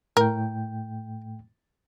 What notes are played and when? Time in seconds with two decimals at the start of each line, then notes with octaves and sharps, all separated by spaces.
0.17 A2 A3 A#4 G5